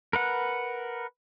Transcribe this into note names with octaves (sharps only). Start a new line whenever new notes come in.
A#4 B4 F#5